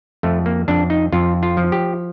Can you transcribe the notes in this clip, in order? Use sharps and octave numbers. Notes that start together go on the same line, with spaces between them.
F2 A3
A#3
F2 D4
D#4
F2 F4
F4
F3
G4